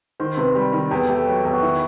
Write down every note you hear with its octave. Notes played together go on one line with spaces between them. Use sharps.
D#3 C5
C3 B4
G3
D#3
E2 G4
A4
A3 G4
F#3
E2
F#4
D#3 E4